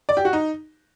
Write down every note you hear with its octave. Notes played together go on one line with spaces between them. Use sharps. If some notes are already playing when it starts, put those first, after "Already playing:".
D5
G4
F#4
D#4